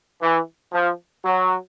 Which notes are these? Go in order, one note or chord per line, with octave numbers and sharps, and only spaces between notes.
E3
F3
F#3